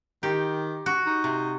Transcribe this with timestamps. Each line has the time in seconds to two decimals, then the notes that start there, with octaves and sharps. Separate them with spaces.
0.23 D#3 G4
0.86 F#4
1.06 D#4
1.24 C3